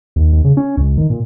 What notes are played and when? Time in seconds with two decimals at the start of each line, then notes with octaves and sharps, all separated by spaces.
0.16 D#2
0.32 D#2
0.44 C#3
0.57 C#4
0.77 C#2
0.98 D#3
1.10 A#2